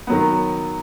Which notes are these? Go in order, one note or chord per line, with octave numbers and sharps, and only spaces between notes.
D#3 F#3 B3